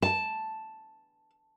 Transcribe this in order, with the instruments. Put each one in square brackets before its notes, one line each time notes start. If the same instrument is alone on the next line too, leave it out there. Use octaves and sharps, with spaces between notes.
[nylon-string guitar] A5